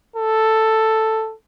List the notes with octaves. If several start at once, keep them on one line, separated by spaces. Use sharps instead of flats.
A4